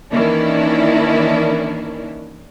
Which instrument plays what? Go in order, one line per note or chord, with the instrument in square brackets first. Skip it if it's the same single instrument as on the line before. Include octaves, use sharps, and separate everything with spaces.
[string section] D#3 E3 A#3 C#4 D4 E4